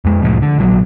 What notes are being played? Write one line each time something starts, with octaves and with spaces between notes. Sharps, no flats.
F2 G#3
C2 A2 F3
D3
A#1 E3 F#3